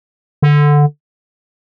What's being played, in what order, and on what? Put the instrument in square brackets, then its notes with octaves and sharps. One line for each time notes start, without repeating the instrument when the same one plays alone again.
[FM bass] D3